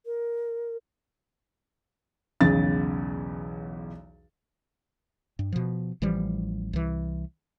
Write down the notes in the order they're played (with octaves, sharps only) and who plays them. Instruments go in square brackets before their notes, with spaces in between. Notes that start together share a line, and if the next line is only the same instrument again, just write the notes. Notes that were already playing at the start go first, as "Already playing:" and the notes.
[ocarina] A#4
[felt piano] B1 E2 C#3 A6
[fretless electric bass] G2
B2 F3
A1 E3 F3 G3
C2 E3